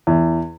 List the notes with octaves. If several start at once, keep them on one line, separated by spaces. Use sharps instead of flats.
E2